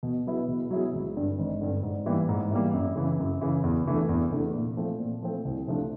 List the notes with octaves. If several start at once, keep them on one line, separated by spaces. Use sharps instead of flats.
B2
F#3 B3 E4 G#4
B2
F#3 B3 E4 G#4
G#1
G2 D3
G#1
G2 D3
G#2
E3 G3 A#3
G#2
E3 G3 A#3
F#2
C#3 E3
F#2
C#3 E3
E2
C3 E3 A3 D4
E2
C3 E3 A3 D4
A#2
F3 A3 C4
A#2
F3 A3 C4
C2
C3 F3 A3 D4